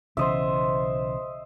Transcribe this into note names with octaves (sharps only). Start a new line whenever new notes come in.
B1 C#3 E3 C5 D#5 E5